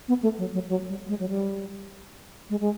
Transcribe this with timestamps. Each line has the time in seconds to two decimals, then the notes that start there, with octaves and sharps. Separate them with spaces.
0.08 B3
0.23 A3
0.38 F#3
0.54 F#3
0.69 F#3
0.88 G3
1.09 G#3
1.20 F#3
1.29 G3
2.50 G#3
2.61 G#3